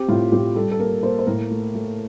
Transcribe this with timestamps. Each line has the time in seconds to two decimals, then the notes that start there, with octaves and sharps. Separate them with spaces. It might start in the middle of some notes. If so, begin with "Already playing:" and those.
Already playing: C4 G4
0.09 A2 F4
0.32 A2 G4
0.55 G3 A4
0.71 A4
0.79 A#3 A#4
1.03 A#3 C5
1.19 C5
1.27 A2 A#4
1.50 A3
1.74 A3